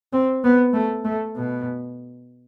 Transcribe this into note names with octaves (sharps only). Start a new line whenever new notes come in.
C4
B3
A3
A3
B2